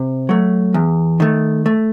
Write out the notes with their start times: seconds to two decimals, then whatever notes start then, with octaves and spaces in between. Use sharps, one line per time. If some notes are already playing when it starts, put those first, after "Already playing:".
Already playing: C3
0.29 F#3 A3
0.74 E2
1.20 D#3 A3
1.66 A3